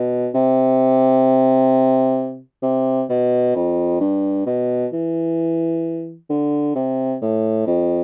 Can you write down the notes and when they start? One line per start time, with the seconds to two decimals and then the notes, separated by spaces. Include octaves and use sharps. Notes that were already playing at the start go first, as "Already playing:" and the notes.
Already playing: B2
0.35 C3
2.62 C3
3.09 B2
3.55 F2
4.00 G2
4.46 B2
4.93 E3
6.30 D3
6.75 C3
7.21 A2
7.67 F2